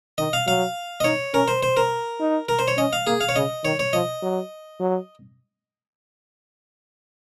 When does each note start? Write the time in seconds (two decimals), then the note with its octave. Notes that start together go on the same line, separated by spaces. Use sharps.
0.18 D#3 D#5
0.33 F5
0.47 F#3 F5
1.00 D#5
1.04 D#4 C#5
1.34 C#4 A#4
1.48 C5
1.63 C5
1.77 A#4
2.20 D#4
2.49 A#4
2.59 C5
2.68 C#5
2.77 C#4 D#5
2.93 F5
3.07 A#3 G#4
3.21 F5
3.29 C#5
3.36 C#3 D#5
3.64 D#3 C#5
3.79 C#5
3.93 F3 D#5
4.22 F#3
4.80 F#3